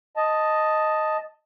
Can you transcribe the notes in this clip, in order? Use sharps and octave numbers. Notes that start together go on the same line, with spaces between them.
D#5 A5